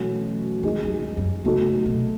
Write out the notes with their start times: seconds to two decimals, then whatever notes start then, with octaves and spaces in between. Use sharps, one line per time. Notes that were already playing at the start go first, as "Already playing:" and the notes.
Already playing: B2 E3 F#3 A3 C#4 F#4
0.63 D#3 G#3 D#4 G#4
0.83 F#2
1.04 E2
1.17 F#2
1.44 C#3 F#3 A3 D#4 F#4 A4
1.85 B2